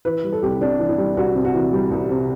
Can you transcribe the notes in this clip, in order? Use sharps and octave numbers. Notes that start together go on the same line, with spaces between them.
E3 B4
G3
A4
C2 G4
C3 D4
E3
E4
G3
C2 F#4
C3
F#4
E3
G3
C2
C3